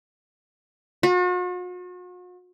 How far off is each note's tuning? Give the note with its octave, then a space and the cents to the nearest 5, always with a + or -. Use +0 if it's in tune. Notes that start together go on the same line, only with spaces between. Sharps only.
F#4 -45